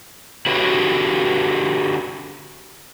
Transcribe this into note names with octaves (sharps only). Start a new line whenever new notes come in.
D3 F#4 G4 B4 C#5